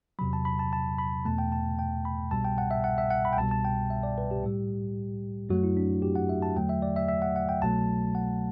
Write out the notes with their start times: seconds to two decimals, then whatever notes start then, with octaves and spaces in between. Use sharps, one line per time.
0.19 E2 C3 F#3 B5
0.33 A5
0.45 B5
0.59 A5
0.73 A5
0.98 B5
1.25 E2 B2 A3 A5
1.38 G5
1.52 A5
1.79 G5
2.05 B5
2.31 C2 B2 G3 A5
2.45 G5
2.58 F#5
2.71 E5
2.84 F#5
2.98 E5
3.10 F#5
3.25 B5
3.33 G5
3.37 C2 B2 G3 A5
3.51 A5
3.65 G5
3.90 E5
4.03 D5
4.18 B4
4.31 G4
4.43 A2 G3
5.49 F#2 F#3 A3 F#4
5.64 E4
5.77 D4
6.02 G4
6.16 F#5
6.29 E5
6.42 A5
6.56 E2 D3 F#3 A3 G5
6.69 E5
6.82 D5
6.96 E5
7.08 E5
7.22 F#5
7.36 F#5
7.49 G5
7.62 C2 B2 F#3 A3 A5
8.15 F#5